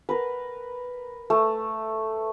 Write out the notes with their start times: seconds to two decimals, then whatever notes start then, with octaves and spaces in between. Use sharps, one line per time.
0.09 A#4 B4
1.30 A3